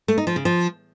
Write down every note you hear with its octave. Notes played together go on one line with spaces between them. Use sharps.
A3
D#4
F3
C#3
F3